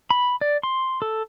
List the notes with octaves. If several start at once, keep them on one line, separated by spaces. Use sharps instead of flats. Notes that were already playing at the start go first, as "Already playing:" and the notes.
B5
D5
C6
A4